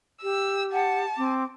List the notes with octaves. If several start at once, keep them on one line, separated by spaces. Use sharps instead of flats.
G4 E6
F#5 A5
C4 D6